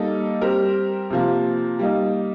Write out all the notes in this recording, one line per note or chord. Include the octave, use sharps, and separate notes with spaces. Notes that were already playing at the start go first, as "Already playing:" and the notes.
Already playing: G3 A#3 D#4 A4
G3 C4 G4 A#4
C3 F3 A#3
G3 A#3 D#4